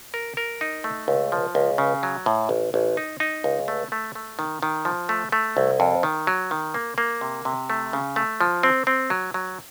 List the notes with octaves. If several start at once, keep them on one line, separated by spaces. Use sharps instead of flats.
A#4
A#4
D#4
A3
C#2
F3
C#2
C#3
F#3
A2
A1
A1
D#4
D#4
C#2
A3
A3
A3
D#3
D#3
F3
A3
A3
C2
F2
D#3
F#3
D#3
A#3
A#3
C3
C3
A3
C#3
A3
F3
C4
C4
F#3
F#3